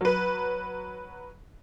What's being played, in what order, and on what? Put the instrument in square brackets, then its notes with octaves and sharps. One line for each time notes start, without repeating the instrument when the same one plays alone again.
[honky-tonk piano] F#3 B4